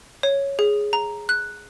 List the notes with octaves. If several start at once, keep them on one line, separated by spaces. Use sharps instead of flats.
C#5
G#4
A#5
F#6